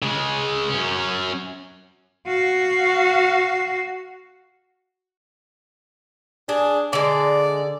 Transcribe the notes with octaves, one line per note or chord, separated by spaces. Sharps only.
C#3 G#3
F#2 C#4
F#4 F5
D4 G#4
D3 G#3 D5